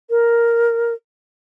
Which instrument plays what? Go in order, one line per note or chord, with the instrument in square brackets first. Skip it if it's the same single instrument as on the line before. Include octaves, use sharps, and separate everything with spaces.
[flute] A#4